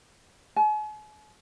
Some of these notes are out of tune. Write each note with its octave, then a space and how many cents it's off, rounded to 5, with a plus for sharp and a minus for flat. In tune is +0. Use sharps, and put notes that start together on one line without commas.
G#5 +45